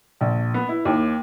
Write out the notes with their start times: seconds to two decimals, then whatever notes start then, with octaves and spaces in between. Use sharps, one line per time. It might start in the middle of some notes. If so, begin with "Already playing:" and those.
0.21 A#1
0.54 B3
0.69 E4
0.85 D#2